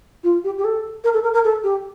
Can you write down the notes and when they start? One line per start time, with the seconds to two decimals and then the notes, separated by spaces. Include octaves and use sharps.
0.23 F4
0.44 G4
0.58 G4
0.64 A4
1.04 A#4
1.13 A4
1.23 A#4
1.33 A#4
1.44 A4
1.63 G4